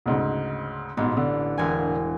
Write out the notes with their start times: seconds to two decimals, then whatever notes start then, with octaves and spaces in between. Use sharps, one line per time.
0.06 D2 G#2 C#3
0.97 A1 G#2 B2
1.17 D3
1.58 E1 A#4 G#5